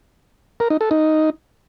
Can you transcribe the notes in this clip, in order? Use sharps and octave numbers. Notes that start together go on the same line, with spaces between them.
A#4
D#4
A4
D#4